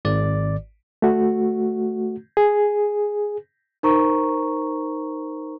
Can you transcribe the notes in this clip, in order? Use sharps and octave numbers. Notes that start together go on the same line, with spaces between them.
G#1 D5
A3 F#4
G#4
D#4 A#4 C5 A#5 C#6